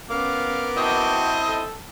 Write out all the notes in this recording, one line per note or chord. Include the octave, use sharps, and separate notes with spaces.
B3 C#4 A#4 F5 D6
C4 E4 F#4 D#5 G5 A5
A4